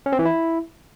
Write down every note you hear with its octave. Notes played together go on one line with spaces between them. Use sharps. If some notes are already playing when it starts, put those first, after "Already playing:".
C#4
C4
E3
E4